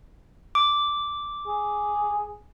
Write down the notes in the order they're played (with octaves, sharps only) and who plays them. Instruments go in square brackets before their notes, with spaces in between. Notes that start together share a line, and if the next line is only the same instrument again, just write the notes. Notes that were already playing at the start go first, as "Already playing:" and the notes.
[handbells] D6
[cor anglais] G#4